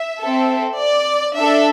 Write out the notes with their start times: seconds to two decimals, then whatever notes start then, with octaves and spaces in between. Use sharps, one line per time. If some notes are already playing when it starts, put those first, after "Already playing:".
Already playing: E5
0.21 C4 A4
0.79 D5
1.36 D4 A4 E5